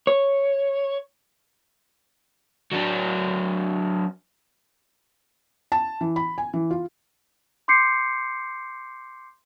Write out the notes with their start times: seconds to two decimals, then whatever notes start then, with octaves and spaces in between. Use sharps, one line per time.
0.07 C#5
2.72 F#3 D4
5.72 A5
6.01 E3
6.16 B5
6.38 G#5
6.54 E3
6.71 F4
7.68 C6 D6 G6 C7 C#7